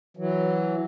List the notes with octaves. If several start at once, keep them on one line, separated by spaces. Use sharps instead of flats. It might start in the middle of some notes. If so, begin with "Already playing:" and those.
E3 F#3